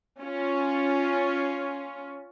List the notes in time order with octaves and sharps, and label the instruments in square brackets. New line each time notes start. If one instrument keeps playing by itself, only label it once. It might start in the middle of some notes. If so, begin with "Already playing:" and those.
[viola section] C#4 F4